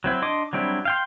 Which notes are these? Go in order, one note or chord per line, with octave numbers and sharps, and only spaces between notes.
F#3 C4 E4
D4 D#5 C6 D6
F#3 G3 C4 D4 E4
F5 G5 C6